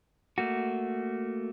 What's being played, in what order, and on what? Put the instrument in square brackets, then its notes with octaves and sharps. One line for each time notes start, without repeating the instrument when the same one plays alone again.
[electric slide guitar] A3 A#3 F#4